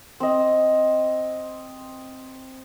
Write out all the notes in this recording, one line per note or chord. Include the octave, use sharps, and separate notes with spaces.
C4 D#5